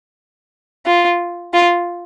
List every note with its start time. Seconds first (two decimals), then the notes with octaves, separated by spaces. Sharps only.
0.86 F4
1.54 F4